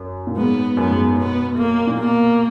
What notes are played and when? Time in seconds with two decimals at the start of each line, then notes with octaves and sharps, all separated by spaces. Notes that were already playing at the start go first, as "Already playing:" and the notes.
Already playing: F#2
0.27 A#2
0.37 G#2 B3
0.77 F#2 B3
0.90 G#2
1.18 B2 B3
1.58 A#3
1.87 A#2
1.98 B2 A#3